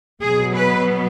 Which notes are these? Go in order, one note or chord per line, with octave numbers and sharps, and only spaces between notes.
B2 F#3 B3 G#4
B4